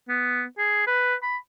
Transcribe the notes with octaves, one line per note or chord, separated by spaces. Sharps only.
B3
G#4
B4
B5